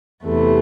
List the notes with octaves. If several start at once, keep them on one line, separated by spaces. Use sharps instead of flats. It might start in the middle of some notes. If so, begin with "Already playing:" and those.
E2 C3 E3 A3